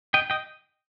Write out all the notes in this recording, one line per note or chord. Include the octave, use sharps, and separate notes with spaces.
D#5 G5
D#5 G5